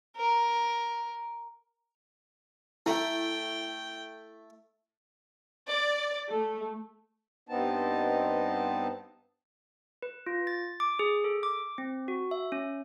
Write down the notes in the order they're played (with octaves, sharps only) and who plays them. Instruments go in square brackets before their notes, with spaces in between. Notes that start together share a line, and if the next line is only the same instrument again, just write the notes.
[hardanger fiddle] A#4
[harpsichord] A3 [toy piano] E4 [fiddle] G5
[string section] D5
A3
[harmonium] G2 B3 C4 D#4 A5
[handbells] B4
F4
A6
D6
G#4
A4
D6
C4
F#4
E5
C#4